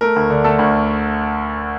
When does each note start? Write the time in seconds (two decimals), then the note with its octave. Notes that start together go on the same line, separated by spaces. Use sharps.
0.01 A3 A#4
0.16 D2
0.30 D3
0.44 A3 A4
0.59 D2